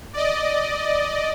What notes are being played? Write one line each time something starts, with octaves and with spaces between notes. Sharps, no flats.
D5 D#5